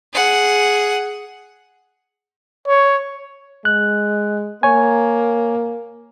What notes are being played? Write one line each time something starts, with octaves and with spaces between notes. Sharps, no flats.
G#4 F#5
C#5
G#3 F#6
A#3 C#5 G#5